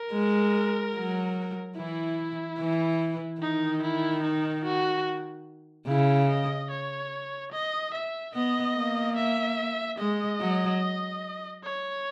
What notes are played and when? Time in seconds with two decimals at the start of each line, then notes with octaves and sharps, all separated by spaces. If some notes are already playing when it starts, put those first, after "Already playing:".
Already playing: A#4
0.13 G#3
0.96 F#3
1.77 E3 E4
2.60 E3
3.41 D#3 D#4
3.82 E4
4.23 D#4
4.65 F#4
5.88 C#3 E4
6.29 D#5
6.70 C#5
7.52 D#5
7.94 E5
8.35 B3 D#5
8.76 A#3
9.16 E5
9.99 G#3 D#5
10.41 F#3
11.64 C#5